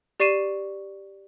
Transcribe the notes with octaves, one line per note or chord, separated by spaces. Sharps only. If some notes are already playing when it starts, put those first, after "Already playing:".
G4 D5 C#6 C7 D#7 E7